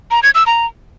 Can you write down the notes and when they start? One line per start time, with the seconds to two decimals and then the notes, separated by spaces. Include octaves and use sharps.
0.11 A#5
0.23 G#6
0.35 E6
0.47 A#5